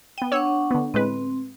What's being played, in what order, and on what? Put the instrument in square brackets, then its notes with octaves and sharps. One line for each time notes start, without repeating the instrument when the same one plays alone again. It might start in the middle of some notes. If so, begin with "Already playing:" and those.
[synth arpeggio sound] B3 D#7 [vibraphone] G5
[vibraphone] D4 F#5 C#6 [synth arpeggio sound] C#5 E6
[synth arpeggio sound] D3 B3
[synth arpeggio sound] A2 G#3 B4 [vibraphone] C4